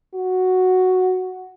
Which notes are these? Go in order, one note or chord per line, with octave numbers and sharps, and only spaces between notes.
F#4